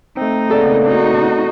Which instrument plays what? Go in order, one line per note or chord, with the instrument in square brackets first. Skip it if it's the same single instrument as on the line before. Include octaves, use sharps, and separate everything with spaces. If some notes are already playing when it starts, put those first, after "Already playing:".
[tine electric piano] A3 C4 [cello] D#4
[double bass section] C#3 A#3 B3 [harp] G#4 A4 D5
[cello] D#4 F#4